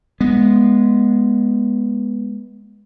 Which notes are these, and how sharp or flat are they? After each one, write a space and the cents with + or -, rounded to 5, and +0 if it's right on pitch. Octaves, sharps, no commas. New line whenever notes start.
G#3 +0 B3 -15